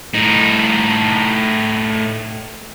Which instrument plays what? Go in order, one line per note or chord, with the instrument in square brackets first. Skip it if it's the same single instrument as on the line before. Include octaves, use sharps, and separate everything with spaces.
[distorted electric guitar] A2 D#4